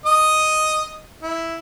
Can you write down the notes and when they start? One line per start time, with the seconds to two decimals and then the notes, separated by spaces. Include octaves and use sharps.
0.06 D#5 D#6
1.23 E4